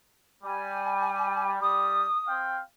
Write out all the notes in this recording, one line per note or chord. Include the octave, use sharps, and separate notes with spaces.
G3 G#5
G3 D#6
C4 F5 G5